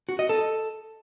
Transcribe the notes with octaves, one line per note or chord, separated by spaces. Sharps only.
F#4
D#5
A4